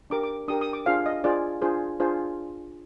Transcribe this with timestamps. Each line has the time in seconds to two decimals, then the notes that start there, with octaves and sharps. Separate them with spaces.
0.10 D4 G4 A#4 D6
0.23 D6
0.48 D4 G4 A#4 D#6
0.61 D#6
0.73 D6
0.86 D4 F4 G#4 C5 F5
1.06 D#5
1.24 D4 F4 G#4 C5 D5
1.61 D4 F4 G#4 C5
2.00 D4 F4 G#4 C5